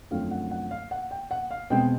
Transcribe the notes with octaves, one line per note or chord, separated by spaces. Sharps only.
F#2 D3 F3 A3 C4 F5
F#5
F#5
F5
F#5
G5
F#5
F5
B2 G#3 C4 G5